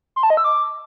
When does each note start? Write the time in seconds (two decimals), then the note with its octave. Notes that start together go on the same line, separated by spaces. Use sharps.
0.16 C6
0.23 A5
0.30 D#5
0.37 E6
0.44 D6